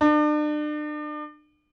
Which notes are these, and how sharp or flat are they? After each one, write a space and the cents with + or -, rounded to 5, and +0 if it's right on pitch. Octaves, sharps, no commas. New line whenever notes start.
D4 +40